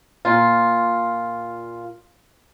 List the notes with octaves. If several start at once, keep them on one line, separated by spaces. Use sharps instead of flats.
A#2 F4